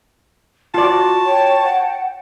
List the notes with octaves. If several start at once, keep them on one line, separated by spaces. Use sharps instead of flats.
F4 F#4 D5 A5
C#5 G5
F#5